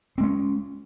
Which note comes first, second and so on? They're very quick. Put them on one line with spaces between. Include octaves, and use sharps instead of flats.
C4 G#3 C#4